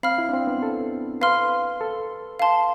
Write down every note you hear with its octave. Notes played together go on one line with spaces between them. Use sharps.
C4 F5 B5 F6
E4
D4
C4
B3
A4
B4 F5 C6 F6
A4
F5 A5 C6